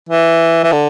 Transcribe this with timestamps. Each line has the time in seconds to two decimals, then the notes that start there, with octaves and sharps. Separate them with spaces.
0.09 E3
0.64 E3
0.73 D3